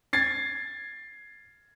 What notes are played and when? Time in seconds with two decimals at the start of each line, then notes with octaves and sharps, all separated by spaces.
0.13 G#6 A6 C7